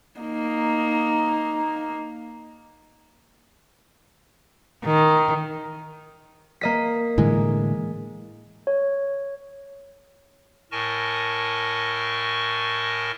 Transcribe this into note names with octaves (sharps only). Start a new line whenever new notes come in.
A#3 D#4
D#3
A#3 D#5 B6
A2 D3 E3 G#3
C#5
A2 A#4 D#5 G#5 A5 C#6